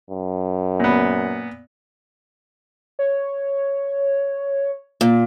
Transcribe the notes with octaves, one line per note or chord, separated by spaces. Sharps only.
F#2
A#2 B3
C#5
A#2